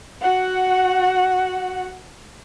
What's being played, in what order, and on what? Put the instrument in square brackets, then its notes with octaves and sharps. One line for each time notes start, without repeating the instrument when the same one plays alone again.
[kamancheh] F#4 F#5